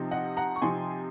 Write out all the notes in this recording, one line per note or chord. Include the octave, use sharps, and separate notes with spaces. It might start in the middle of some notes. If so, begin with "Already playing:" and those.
Already playing: C3 F3 C4 D#4
D#5 F#5
F#5 A#5
C#6
C3 F3 C4 D#4 G#5 C6